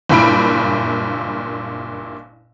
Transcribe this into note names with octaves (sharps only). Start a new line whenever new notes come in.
F#1 G2 A#2 E4 B5 D7